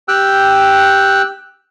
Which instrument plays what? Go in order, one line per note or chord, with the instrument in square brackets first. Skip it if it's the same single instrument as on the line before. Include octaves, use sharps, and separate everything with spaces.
[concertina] G4 G5 E6 F#6